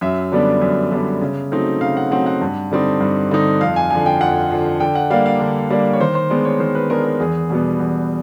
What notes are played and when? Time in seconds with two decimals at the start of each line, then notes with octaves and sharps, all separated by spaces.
0.01 F#2 E5
0.32 D3 G3 B3 D4
0.61 F#2
0.91 D3 G3 B3 D4
1.21 C#3
1.52 F#3 A3 C4 D#4
1.81 C#3 F5
1.97 F#5
2.11 F#3 A3 C4 D#4 F#5
2.26 F#5
2.41 G2
2.71 D3 G3 C4 D#4
3.01 G2
3.31 D3 G3 C4 D#4
3.61 F2 F5
3.76 G#5
3.90 D3 F3 G#5
4.06 G5
4.21 F2 F#5
4.51 D3 F3
4.80 D3 G5
4.95 F#5
5.10 G3 A#3 D4 F5
5.26 F5
5.40 D3
5.70 G3 A#3 D4
5.93 C#5
6.01 D#3 C5
6.15 C5
6.30 G#3 B3 D4 D5
6.45 C#5
6.60 D#3 C5
6.75 B4
6.90 G#3 B3 D4 A#4
7.05 A#4
7.20 E2 G#4
7.50 B2 G3 B3
7.80 E2